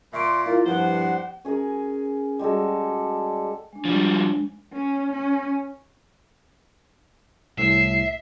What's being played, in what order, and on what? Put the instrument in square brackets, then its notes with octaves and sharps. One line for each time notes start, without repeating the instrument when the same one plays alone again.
[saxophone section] A#2 [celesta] E5 C#6 D7 [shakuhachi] C6
[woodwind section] A#3 F4 [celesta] E4 [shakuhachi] F5
[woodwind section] G2 F3 [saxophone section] B3 D4 C5 [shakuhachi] F#5
[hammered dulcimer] C#4 G#4 A#4 G#5
G3 G#3 F#4 A4
[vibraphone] G#3 D4
[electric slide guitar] F3 G3
[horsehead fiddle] C#4
C#4
[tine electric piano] C2 A2 [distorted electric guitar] E5 [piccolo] C7